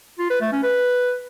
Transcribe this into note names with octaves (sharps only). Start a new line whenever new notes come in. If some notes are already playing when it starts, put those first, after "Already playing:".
F4
B4
A3
C#4
B4